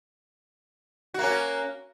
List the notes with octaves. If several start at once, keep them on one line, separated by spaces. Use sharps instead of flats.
A#3 C#4 F#4